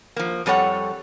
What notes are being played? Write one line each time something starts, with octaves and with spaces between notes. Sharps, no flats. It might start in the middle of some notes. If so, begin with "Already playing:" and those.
F3 A#3
F2 G3 A4 C#5 F#5